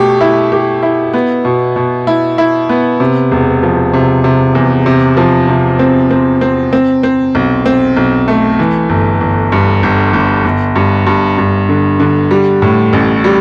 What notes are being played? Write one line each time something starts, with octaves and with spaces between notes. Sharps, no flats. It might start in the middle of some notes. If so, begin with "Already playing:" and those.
Already playing: B2 A3 G4
E4
G4
E4
B3
B2
B2
E4
E4
B3
C3
E1
F3
C3
C3
E2
C3
F3
C3
C4
C4
C4
C4
C4
B1
C4
B1
A3
E3
G1
G1
G2
G1
G1
G1
G2
G2
G2
D3
D3
G3
A2
A1
G3